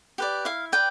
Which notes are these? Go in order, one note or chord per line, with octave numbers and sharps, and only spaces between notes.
G4 B4 D5
E4 F5
B4 D5 G5